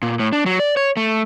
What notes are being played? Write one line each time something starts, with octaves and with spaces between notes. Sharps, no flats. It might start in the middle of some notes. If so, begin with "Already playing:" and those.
A#2
A2
D4
F#3
D5
C#5
A3